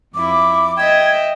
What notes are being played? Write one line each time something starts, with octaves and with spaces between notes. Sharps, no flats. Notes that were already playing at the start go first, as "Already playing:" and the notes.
F2 E4 D6
D#5 E5 G5 G#6